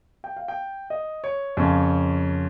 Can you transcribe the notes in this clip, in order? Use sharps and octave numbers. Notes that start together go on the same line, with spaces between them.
G5
F5
G5
D#5
C#5
F2 C#3 F3 A#3 C#4